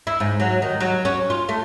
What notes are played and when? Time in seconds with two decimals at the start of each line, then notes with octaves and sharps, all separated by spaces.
0.07 E4
0.20 G#2
0.40 F#3
0.62 D#3
0.81 F#3
1.05 C#4
1.30 F4
1.49 A3